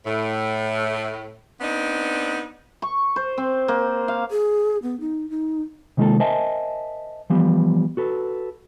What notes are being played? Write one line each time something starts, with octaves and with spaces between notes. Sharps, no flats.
A2
B3 C4 D4 D#4
C#6
C5
C4
A#3
F5
G#4
B3
D#4
D#4
C3 D#3 G#3 A#3 F4 A4
A#4 C5 D#5 E5 G#5 A5
E3 F3 G3 B3
F#4 A4 B4